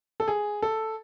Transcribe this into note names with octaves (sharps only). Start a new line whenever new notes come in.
A4
G#4
A4